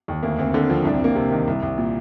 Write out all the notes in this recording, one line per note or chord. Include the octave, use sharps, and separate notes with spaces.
D#2
D2 A#3
D2 C4
D3 C4
F3 C4
C2 D4
C4
C2 A#3
C3 C4
D#3
C2
C2
A#2